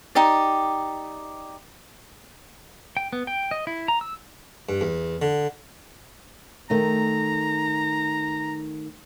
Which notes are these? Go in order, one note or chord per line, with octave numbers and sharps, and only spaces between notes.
D#4 G4 D5
G5
B3
G5
D#5
E4
A#5
E6
G2
E2
D3
D#3 A3 A#5